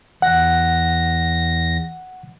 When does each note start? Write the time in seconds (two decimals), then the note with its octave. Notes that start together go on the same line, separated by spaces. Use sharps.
0.22 E2 F#5 A#6